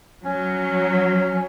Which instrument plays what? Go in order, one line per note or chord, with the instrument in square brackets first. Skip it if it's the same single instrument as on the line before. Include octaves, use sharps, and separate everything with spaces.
[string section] F#3 [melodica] C#4